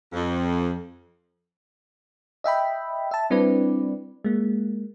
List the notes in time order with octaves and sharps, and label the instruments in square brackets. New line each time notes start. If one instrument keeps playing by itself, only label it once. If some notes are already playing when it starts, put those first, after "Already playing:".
[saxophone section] F2
[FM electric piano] D#5 E5 G5 B5
E5 A5
G3 C4 D4 E4 B4 D5
G#3 A#3